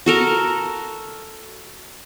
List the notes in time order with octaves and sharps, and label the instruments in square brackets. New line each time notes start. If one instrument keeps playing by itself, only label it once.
[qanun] F#4 A4 A#4